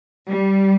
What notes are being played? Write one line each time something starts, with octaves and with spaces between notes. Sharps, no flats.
G3